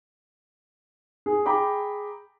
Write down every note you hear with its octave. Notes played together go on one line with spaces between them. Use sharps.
G#4
G#4 G5 A#5 B5 D6